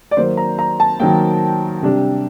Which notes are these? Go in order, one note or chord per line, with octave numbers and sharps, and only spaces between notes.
D5
D#3 F#3 A#3 C5
A#5
A#5
A5
D#3 F#3 A#3 G5
C3 G3 D4